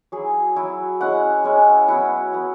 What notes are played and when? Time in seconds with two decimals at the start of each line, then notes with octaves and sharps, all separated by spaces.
0.12 F#3 E4 G#4
0.56 F#3 E4
1.00 G#3 C#4 E4 F#5
1.44 G#3 C#4 E4
1.88 F#3 B3 E4 F#5
2.32 F#3 B3 E4